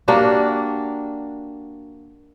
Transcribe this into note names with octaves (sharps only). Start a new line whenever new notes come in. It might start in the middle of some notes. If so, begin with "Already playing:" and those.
A#3 D4 F#4 G4